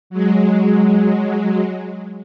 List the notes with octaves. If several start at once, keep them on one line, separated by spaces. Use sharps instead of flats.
F#3 G#3